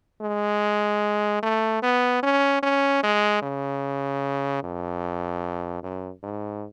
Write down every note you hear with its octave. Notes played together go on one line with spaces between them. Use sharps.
G#3
A3
B3
C#4
C#4
G#3
C#3
F2
F#2
G#2